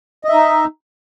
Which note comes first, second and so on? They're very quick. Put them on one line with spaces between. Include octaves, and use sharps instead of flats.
D#5 E5 D#4